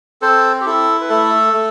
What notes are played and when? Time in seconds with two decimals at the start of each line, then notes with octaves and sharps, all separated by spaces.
0.22 C4 A4 C5
0.61 G4
0.66 E4 A4
1.01 B4
1.09 A3 A4
1.53 A3